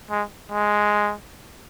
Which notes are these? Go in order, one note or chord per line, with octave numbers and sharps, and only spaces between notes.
G#3
G#3